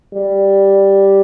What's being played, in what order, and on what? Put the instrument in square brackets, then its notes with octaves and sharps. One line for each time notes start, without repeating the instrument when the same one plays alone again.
[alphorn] G3